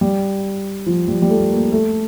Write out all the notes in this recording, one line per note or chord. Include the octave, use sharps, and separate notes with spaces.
G3
F3
G3
G3
A3
A#3
A3